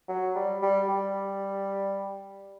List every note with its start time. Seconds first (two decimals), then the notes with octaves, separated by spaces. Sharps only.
0.08 F#3
0.35 G3
0.62 G3
0.89 G3